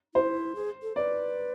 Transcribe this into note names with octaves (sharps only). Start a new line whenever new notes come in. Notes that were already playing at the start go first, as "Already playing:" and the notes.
E4 C5
G#4
A4
B4 D5